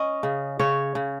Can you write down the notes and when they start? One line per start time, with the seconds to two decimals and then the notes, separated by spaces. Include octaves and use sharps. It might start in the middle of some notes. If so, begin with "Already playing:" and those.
Already playing: C#4 D#5
0.23 C#3
0.59 C#3 C#5
0.95 C#3